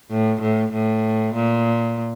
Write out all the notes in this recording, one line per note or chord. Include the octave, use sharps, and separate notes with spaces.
A2
A2
A2
A#2